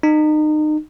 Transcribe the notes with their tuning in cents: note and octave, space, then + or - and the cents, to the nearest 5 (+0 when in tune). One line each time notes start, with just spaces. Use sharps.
D#4 -30